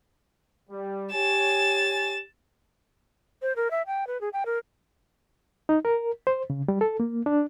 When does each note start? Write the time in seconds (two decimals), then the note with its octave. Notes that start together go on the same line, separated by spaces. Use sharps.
0.70 G3
1.13 G4 C#5 G#5 A6 E7
3.42 C5
3.56 A#4
3.71 E5
3.87 G5
4.07 B4
4.21 G#4
4.33 G5
4.46 A#4
5.69 D#4
5.85 A#4
6.27 C5
6.50 C#3
6.68 G3
6.81 A4
7.00 A#3
7.26 D4